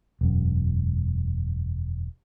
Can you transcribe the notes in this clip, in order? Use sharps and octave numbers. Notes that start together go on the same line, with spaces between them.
E1 F#2